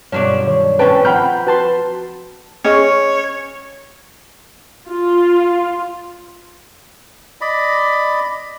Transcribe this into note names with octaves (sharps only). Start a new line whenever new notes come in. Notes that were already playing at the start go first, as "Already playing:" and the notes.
G2 B2 F3 F#3 C#5 D5
D#3 C#5
A2 C#4 B4 C5 G5 A5
F3 C4 F#5 G5 A#5 B5 F6 G6
F#4 B4 A5 C6
C#4 G#4 C#5 D#5
F4
D5 D#5 B5